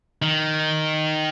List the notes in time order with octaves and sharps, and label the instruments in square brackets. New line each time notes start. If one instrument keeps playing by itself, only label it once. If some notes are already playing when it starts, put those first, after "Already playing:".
[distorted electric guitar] D#3